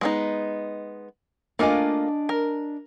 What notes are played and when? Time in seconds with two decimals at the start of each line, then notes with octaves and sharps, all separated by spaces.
0.01 G#3 B3 D#4
1.59 A3 A#3 D4 F4 D#5 G#5
2.29 A#4